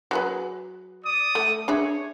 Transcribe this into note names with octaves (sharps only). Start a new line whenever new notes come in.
F#3 G#4 B4
D5 D#6
A3
D4 G#4 C#5 E5